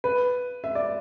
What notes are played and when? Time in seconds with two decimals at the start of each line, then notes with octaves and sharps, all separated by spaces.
0.04 B4
0.64 E5
0.75 D5